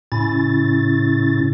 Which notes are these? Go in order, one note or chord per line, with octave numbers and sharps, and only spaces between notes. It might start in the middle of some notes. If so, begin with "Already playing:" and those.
A2 C#3 C#4 E4 A6